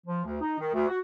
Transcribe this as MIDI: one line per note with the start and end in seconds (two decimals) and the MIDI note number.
0.06 0.23 53
0.25 0.38 38
0.41 0.57 63
0.59 0.72 51
0.73 0.86 38
0.88 0.98 66